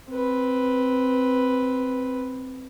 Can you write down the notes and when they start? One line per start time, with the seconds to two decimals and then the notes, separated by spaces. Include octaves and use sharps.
0.11 C4 B4